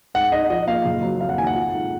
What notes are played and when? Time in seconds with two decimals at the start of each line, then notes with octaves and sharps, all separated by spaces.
0.14 G#2 F#5
0.32 D#4 D#5
0.50 F3 D#5
0.67 A#3 F5
0.85 F#1
1.03 F#3
1.21 F2 F5
1.29 F#5
1.38 D#3 G#5
1.47 F#5
1.56 F4
1.73 G#2